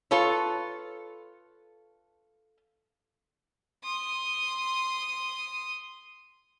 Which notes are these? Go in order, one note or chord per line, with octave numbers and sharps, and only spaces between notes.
F4 A4 B4 C#5
C6 D#6